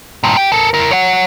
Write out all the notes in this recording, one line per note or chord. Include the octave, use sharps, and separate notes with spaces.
G2 A#2
G4 G5
A4 A#4
E4 A#4
C#5 F#5